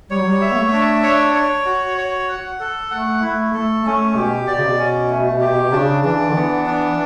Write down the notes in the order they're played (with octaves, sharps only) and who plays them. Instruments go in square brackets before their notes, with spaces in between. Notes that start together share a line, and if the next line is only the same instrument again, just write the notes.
[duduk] G3 [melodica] C#5
[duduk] F#3
G3
[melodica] E5
[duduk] B3
A3
[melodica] D4
C#5
C#5
F#4
C#5
F#5
A4
[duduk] A3 [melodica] F#5
[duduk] A3 [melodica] E4
[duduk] A3 [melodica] A4
[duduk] A3 [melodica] C#4
[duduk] B2 [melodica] G4
[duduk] B2 [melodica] D5
[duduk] C#3
B2
[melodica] C#4
A3
G4
[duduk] C#3 [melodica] D4
[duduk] E3 [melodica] D4
[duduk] D3
[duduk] E3 [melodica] B3
[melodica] D4